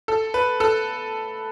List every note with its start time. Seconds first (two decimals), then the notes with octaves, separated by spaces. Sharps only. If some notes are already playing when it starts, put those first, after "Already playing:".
0.08 A4
0.34 B4
0.60 A4